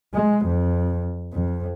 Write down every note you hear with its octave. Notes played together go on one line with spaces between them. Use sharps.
G#3
F2
F2